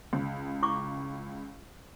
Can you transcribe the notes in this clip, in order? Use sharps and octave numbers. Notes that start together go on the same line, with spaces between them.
C#2
E4 C#6 D6